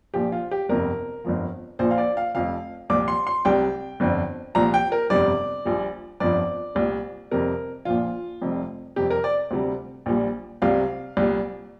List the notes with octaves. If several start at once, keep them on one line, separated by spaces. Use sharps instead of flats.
A#1 A#2 F3 G4
F4
G4
G1 F2 C3 A#4
G1 F2 F3
A#1 A#2 F3 C5
F5
D5
F5
F1 F2 F3 F5
C2 A#2 F3 D6
C6
C6
C2 C3 G3 G5
G1 F2 D3
C2 A#2 F3 A#5
G5
A#4
G1 F2 C3 G3 D5
A#1 A#2 G3
G1 F2 F3 D5
C2 A#2 G3
F2 C3 G3 A#4
A#1 A#2 F3 F4
F1 F2 C3 G3
F2 C3 G3 G4
A#4
D5
D2 C3 G3
A#1 A#2 G3
C2 C3 G3 F5
C2 A#2 G3